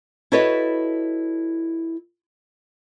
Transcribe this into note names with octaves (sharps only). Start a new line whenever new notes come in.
E4 F#4 A4 B4 C#5 D#5